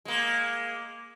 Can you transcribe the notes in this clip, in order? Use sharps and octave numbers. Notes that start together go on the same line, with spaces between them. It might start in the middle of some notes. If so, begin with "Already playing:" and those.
G#3 A#3